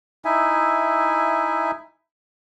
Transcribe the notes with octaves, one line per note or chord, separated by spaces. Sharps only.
D#4 E4 E5 G#5